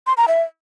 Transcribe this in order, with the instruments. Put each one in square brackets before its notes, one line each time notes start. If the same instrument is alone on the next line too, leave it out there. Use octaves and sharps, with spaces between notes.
[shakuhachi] C6
A#5
E5